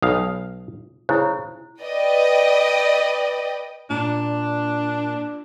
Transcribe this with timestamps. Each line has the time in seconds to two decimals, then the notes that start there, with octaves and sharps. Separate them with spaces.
0.02 B1 F5 D#6
1.09 C#3 E4 C5
1.81 B4 D5 D#5 G5
3.90 A#2 D4